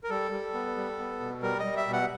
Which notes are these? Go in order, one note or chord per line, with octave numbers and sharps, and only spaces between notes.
A#4
G3 A4
G3
B3
G3
B3
B2
G3 A#4
D#5
G3
E5
B2
F#5